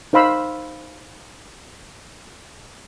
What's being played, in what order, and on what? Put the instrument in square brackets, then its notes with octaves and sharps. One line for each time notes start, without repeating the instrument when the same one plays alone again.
[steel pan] D#4 C5 F5 B5 E6